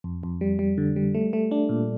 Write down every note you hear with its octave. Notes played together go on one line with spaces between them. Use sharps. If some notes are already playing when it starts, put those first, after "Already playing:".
F2
F2
G3
G3
D3
G3
A3
A3
D4
A#2